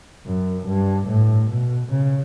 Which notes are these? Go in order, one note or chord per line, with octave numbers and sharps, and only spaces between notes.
F#2
G2
A2
B2
C#3